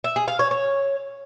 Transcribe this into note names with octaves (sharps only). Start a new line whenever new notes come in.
E5
G#4
F5
C#5
C#5